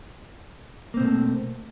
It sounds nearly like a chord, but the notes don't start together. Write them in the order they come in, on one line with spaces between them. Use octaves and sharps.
A#3 C4 B2 A3